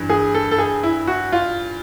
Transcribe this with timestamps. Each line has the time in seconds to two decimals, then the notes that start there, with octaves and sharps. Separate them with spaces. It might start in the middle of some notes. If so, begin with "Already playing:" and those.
Already playing: G2 E3
0.10 G#4
0.34 A4
0.51 A4
0.58 G#4
0.83 E4
1.07 F#4
1.33 F4